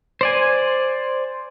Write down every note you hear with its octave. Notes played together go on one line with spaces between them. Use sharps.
C5 D5 G#5